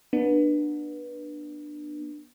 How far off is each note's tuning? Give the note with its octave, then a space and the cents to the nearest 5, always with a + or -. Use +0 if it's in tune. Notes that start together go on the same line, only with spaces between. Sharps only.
B3 -25 D4 +20